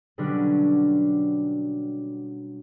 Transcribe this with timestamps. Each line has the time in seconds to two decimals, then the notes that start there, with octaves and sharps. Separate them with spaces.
0.18 B2 D3 F#3 G3 C#4 D4